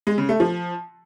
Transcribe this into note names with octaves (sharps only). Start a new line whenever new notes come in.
G#3
C#3
A3
F3